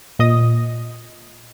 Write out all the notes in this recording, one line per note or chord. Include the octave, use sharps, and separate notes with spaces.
A#2 D#5 D#6